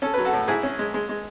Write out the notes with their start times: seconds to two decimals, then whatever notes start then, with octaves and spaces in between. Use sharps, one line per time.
0.02 C#4 A4
0.14 F#3 B4
0.25 F#4 A4
0.33 A2
0.48 G#2 E4 G#4
0.63 C#4
0.79 G#3
0.94 G#3
1.09 G#3